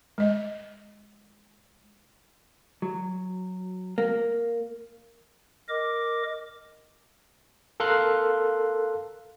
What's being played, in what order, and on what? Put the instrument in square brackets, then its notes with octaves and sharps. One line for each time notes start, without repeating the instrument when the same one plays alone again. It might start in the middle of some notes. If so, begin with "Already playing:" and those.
[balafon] G#3 D#5
[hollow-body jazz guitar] F#3
A#3
[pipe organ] A#4 D#5 D6
[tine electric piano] A4 A#4 F5 C6 F#6